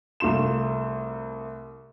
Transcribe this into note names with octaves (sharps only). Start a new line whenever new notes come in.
C2 A3 F4 C6 E7